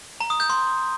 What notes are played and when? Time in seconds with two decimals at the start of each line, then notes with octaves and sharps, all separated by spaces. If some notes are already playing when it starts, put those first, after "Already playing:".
0.20 A#5
0.30 D#6
0.40 G6
0.50 C6